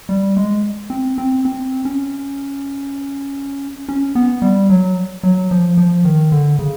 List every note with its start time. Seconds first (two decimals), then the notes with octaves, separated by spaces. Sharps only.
0.09 G3
0.37 G#3
0.90 C4
1.18 C4
1.45 C4
1.85 C#4
3.89 C#4
4.15 B3
4.42 G3
4.70 F#3
5.23 F#3
5.51 F3
5.77 F3
6.05 D#3
6.32 D3
6.59 C#3